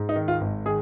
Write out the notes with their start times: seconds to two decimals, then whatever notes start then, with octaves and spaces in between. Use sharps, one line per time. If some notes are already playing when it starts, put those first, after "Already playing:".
Already playing: G#2
0.09 D#4
0.16 D#3
0.28 F4
0.41 G#1
0.66 D#3 G#4